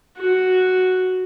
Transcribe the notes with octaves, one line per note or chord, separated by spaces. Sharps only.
F#4